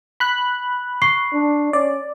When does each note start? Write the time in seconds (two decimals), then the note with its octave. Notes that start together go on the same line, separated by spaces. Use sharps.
0.20 B5 F#6
1.02 C#6 C7
1.33 D4
1.73 C#4 D5